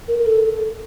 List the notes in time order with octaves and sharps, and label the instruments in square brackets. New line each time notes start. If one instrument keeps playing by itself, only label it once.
[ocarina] A#4
A#4
A4